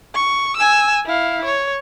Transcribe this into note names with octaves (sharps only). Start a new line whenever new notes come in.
C#6
G#5 E6
E4 F5
C#5